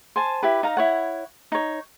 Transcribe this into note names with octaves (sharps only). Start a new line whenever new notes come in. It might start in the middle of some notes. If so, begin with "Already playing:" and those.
C5 G#5 A5
E4 G4 B4
D#4 F5 A#5
E4 C#5 F#5
D#4 C#5